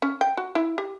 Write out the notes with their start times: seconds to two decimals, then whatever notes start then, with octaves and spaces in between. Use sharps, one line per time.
0.02 C#4
0.21 G5
0.37 F#4
0.55 E4
0.78 G4